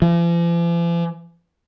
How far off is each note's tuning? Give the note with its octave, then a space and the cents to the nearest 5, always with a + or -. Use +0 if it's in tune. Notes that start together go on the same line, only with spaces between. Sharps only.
F3 -45